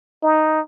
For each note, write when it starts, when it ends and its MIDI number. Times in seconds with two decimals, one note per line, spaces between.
0.22 0.60 63